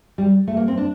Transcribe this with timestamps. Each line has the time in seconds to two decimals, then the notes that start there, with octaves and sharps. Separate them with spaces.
0.18 G3
0.48 A3
0.57 A#3
0.68 C4
0.77 D4